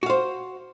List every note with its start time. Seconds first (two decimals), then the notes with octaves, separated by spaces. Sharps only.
0.03 F#4
0.06 F5
0.10 C5